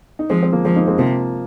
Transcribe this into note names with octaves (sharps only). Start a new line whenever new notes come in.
D#4
F3 G#3 C4
C4
F3 A#3
F3 G#3 C4
A#3 D#4
G#3 C4
C3 F3 A#3